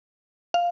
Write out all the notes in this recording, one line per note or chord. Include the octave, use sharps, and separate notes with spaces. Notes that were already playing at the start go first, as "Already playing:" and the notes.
F5